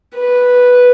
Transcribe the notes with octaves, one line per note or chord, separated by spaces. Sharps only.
B4